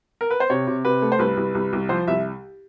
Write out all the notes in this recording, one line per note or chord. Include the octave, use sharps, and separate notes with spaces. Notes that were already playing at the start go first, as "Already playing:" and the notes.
A#4
B4
C5
C3 C#5
C3
C3 B4
A3
C5
C2 B4
C2
C2
C2
F3 C5
C2 E5